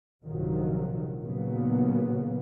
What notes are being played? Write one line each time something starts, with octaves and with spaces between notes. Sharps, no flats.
A#1 G2 C3 D#3 F3 F#3
D#2 A#2 C#3 F#3 A#3 B3